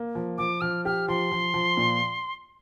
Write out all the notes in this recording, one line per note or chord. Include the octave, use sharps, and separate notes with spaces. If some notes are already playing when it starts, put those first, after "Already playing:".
Already playing: A#3
F3
F3 D6
F3 F6
G4 F6
F3 C6
F3
F3
A#2